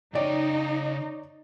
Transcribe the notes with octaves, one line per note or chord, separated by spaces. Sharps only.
C#3 D#4 C#5 D5 G5